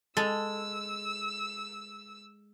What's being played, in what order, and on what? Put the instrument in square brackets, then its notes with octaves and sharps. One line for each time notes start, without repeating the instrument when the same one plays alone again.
[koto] G#3 [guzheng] A4 [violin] E6